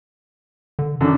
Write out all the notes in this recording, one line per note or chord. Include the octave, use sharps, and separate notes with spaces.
D3
F#2 D3 D4